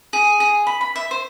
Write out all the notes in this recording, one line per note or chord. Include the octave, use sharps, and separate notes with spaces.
G#4
G#4
B5
B5
E5
C5